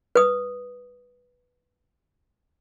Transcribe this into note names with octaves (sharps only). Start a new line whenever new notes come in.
B4 D#6